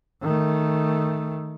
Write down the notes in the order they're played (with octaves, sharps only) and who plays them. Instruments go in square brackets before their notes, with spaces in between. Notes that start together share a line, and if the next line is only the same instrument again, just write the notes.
[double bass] D#3 A3